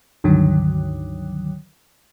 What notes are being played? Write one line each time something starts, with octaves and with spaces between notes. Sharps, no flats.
C#2 G2 D3 D#3 F#3